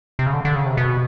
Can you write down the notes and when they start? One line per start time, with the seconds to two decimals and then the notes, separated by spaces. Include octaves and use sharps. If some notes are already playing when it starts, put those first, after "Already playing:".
0.19 C3
0.26 C#3
0.33 D3
0.45 D3
0.55 C#3
0.66 C3
0.77 B2